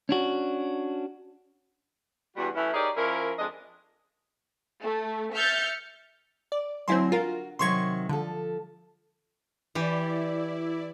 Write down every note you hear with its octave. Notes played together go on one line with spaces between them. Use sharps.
C#4 D4 F#4
E2 G2 G3 F#4
E3 A3 C#4 E4
D#4 G4 G#4 A#4 C#5 D5
F3 C#4 E4 A#4
F2 G#3 D4 D#5
A3
E5 F6 G6 A6 C#7
D5
D2 F#3 C4 E4 G#5 C6
F4 F#4 A#4
C3 D#3 F#3 C6 C#6 G#6
D3 F3 A4
E3 E4 G4 D5